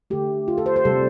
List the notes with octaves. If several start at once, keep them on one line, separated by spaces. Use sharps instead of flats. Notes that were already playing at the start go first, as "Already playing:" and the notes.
D3 A3 G4
F4
A4
C5
C5
C3 G3 A4